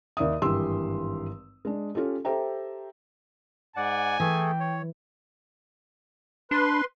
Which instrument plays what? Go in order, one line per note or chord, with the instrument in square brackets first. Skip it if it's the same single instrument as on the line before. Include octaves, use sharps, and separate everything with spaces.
[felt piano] D#2 D5 E5 D#6
G#1 G2 E3 G4 C6 E6
G#3 D4
C#4 F4 G4 A4
G4 A4 C5 E5 G5 A#5
[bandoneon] G#2 D5 F#5 [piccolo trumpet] G#5
[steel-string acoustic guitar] E3 [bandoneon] A3 G#4 A4 [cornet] G5
[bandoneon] C#5
[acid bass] D4 [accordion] B4 C6